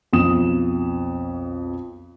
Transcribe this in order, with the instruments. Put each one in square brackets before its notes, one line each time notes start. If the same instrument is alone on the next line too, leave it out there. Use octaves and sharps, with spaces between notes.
[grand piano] B1 F2 D#6 E7